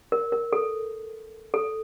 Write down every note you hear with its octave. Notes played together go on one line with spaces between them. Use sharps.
A#4
A#4
A4
A4